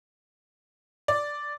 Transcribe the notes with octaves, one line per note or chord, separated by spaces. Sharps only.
D5